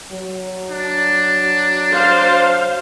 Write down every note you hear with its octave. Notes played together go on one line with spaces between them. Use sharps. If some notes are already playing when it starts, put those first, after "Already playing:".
F#3
D4
C5 F5